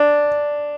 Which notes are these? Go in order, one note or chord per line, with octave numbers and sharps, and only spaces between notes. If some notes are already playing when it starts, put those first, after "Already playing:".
Already playing: D4